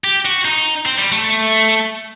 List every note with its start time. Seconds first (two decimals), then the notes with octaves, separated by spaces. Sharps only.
0.04 G4
0.25 F#4
0.45 D#4
0.86 C4
0.98 G3
1.12 A3